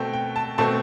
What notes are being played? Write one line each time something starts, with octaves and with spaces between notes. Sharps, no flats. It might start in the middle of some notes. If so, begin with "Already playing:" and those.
Already playing: B2 A3 C4 G5
G5
A5
B2 A3 C4 A5